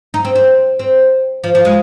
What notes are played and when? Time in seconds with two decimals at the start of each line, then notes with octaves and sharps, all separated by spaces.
0.14 D#4
0.25 C4
0.35 C4
0.79 C4
1.44 F3
1.55 F3
1.65 G#3